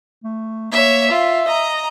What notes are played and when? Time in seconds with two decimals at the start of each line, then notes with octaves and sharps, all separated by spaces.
0.24 A3
0.72 A#3 C#5 E5
1.11 F4 E5
1.48 D#5 A#5